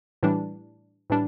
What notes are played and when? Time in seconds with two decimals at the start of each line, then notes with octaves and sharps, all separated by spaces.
0.23 A2 E3 G3 D4
1.10 A2 E3 G3 D4